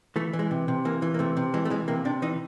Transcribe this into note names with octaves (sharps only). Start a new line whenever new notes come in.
E3 A3
E3
G#3
C3
C3
E3 A#3
E3
A#3
C3 A3
C3
E3 G#3
A3
E3 G#3
C3 A#3
C3 D4
E3 D#4